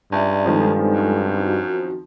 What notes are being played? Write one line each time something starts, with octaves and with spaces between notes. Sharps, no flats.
C#2 G2 D5 E5
D#3 F3 G#3 C4 A4 G#5
F#2
F#4